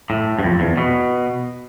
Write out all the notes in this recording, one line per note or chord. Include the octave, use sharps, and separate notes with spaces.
A2
G2
F2
E2
B2